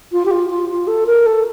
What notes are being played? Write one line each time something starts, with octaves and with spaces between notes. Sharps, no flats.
F4
G4
F4
F4
F4
A4
A#4
A4